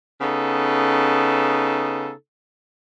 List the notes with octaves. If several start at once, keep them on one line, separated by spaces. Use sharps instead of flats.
C#3 B3 D#4 A4